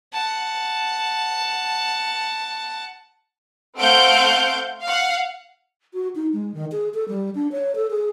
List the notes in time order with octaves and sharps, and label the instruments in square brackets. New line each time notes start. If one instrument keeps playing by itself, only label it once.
[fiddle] F#5 A5
[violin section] A3 C4 F5 F#5 G6 D7
F5 F#5
[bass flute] F#4
D#4
G#3
D#3
G#4
A4
G3
D4
C#5
A4
G#4